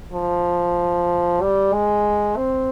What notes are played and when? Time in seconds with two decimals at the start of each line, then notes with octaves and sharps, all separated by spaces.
0.13 F3
1.41 G3
1.73 G#3
2.37 C4